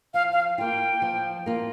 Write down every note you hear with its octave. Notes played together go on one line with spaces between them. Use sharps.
F3 F5
F5
A#3 F4 G5
F3
A#3 F4